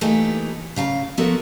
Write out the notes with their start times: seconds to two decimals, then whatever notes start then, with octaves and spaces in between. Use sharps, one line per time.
0.01 E3 A3 A#3 D#4 F4 G4
0.76 C#3 F5 A5 A#5
1.18 F3 B3 F#4 A4 A#4 E5